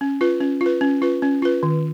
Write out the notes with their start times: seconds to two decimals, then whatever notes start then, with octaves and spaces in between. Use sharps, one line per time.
0.01 C#4
0.21 F4 B4
0.40 C#4
0.61 F4
0.66 B4
0.81 C#4
1.02 F4 B4
1.22 C#4
1.42 F4 B4
1.63 D#3